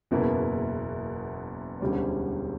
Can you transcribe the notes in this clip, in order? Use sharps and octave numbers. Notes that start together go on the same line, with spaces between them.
F#1 E2 B2 A#3 E4
E1 D2 D3 G3 C#4